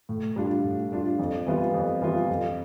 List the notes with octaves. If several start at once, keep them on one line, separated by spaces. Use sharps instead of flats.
A2
G3 D4 F4
A2
G3 D4 F4
F2
E3 G3 B3 F4
F2
E3 G3 B3 F4
F2